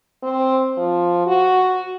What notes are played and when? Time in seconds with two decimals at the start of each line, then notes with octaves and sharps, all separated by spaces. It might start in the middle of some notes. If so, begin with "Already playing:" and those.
0.23 C4
0.77 F3
1.27 F#4